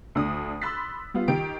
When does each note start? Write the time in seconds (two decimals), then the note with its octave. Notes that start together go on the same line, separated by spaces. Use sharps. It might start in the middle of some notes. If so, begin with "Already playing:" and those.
0.15 D2 D4 D#6
0.62 B5 C6 E6 F#6 A6 B6
1.14 G3 B3 F4
1.28 D#3 G4 D7